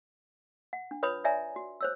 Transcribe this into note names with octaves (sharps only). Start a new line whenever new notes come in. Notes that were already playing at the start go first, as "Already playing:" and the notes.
F#5
D4
F4 B4 C#5 B5 D#6
C#5 D5 E5 G#5 A#5
F#4
C5 C#5 E6